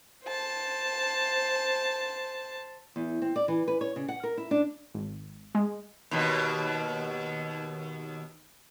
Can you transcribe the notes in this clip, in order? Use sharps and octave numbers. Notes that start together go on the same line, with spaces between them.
C5 A5
E2
C4
D5
E3
B4
C#5
C#3
F#5
A#4
E4
D4
G#1
G#3
D#2 B2